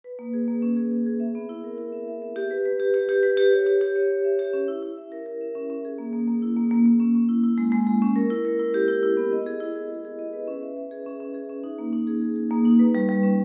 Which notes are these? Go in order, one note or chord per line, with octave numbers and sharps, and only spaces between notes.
B4
A#3
G#4
A#3
C#4
G#4
G#4
G#4
E5
B3
E4
A#4
E4
E5
E5
E5
G4
B4
B4
G4
G4
G4
B4
G4
C#5
G4
G4
C#5
C#5
E5
G4
C#4
E4
E4
E5
A#4
A#4
E5
C#4
C#4
G#4
A#3
A#3
A#3
E4
A#3
A#3
A#3
C#4
C#4
E4
E4
G#3
G#3
G#3
C#4
A#4
E4
A#4
E4
G4
E4
E4
B3
D#5
G#4
E4
G#4
G#4
G#4
D#5
B4
C#4
E5
E5
G#4
C#4
C#4
G#4
C#4
D#4
A#3
D#4
G#4
G#4
G#4
A#3
D#4
B4
G3
G3
C#4